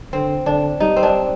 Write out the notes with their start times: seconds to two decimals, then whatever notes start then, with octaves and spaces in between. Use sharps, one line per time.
0.13 D3 C4
0.46 D3 D4
0.80 G3 D#4
0.96 C4
1.03 D4